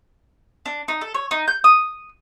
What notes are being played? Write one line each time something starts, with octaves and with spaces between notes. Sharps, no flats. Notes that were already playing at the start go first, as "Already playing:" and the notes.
D4
D#4
A4
C#5
D#4
G6
D#6